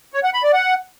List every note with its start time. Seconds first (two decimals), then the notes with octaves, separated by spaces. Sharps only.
0.13 C#5
0.23 F#5
0.33 B5
0.43 D5
0.53 F#5